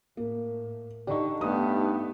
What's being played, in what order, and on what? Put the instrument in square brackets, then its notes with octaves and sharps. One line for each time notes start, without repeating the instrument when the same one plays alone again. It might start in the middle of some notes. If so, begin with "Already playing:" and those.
[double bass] A2 [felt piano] A#3
[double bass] D3 [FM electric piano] D#4 G4 [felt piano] D5 C#6
[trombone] G2 [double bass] A3 B3 [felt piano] D#6